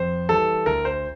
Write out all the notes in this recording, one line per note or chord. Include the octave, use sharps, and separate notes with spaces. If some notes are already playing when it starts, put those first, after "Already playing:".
Already playing: F2 C5
E3 G3 A4
D2 A#4
C5